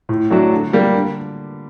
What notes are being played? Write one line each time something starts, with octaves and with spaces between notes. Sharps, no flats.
A2
F#3 A3 D4 F#4
D3
G3 A#3
D3